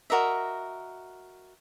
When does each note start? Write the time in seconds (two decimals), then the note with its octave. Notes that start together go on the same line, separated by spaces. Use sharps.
0.10 F#4 A#4 D#5 E5